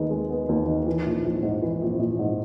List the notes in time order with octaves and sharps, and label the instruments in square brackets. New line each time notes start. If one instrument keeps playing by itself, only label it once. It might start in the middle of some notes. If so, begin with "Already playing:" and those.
Already playing: [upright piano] D#2 D#3 G#3 B3
G#3
B3
D#2
D#3
E3
A#1
A#1
G#2
E3
A#1
A#1
G#2